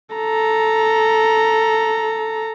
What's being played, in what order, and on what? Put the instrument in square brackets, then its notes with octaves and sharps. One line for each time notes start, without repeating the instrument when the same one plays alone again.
[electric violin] A4 A#5